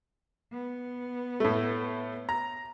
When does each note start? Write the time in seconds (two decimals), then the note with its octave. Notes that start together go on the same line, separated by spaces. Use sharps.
0.52 B3
1.40 A2 A3
2.29 A#5